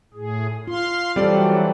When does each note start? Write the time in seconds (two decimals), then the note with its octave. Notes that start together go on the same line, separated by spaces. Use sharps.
0.14 A2 G#4
0.67 F4 F5 C6
1.16 E3 F#3 G3 C4 G4 A4 D5